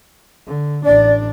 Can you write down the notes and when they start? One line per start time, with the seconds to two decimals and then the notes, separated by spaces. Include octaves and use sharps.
0.47 D3
0.85 A1 D4 D5